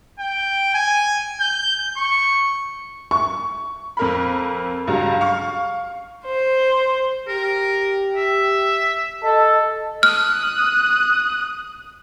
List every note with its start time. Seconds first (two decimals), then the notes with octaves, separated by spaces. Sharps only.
0.19 G5
0.75 G#5
1.40 G6
1.97 C#6
3.11 C#6
3.97 F2 A#4 B5
4.87 C#2 G2 F#3 A#5
5.21 F5 C#6
6.25 C5
7.28 G4 A#4
8.16 E5
9.24 A4 D#5
10.03 D#6 F6 F#6